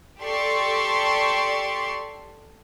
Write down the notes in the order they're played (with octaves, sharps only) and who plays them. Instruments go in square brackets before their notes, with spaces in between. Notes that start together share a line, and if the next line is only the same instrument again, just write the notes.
[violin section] G4 A4 D5 C6 C#6